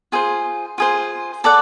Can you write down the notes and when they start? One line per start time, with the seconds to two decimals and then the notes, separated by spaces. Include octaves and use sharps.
0.12 F4 G#4 C5
0.78 F4 G#4 C5
1.44 A4 D5 F#5